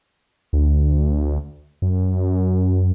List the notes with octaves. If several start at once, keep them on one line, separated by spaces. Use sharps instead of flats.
D2
F#2